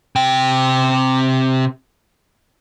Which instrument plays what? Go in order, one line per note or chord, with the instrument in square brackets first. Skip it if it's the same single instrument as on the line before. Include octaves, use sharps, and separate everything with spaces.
[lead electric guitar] C3 G5